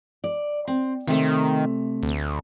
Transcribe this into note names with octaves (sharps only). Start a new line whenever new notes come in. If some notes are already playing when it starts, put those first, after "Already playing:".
D5
C4
C3 D#3 A3
D2